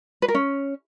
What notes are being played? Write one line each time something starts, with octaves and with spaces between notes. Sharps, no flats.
B4
A#4
C#4